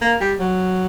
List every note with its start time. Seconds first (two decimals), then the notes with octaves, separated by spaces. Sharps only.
0.01 A#3
0.20 G3
0.40 F#3